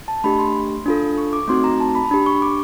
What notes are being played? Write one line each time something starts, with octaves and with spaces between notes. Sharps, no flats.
A5
A3 D4 G4 B5
C6
D4 F4 A4
C#6
D6
A3 C4 D#4 F#4 C6
A#5
A5
B5
D4 G4 B5
C#6
D6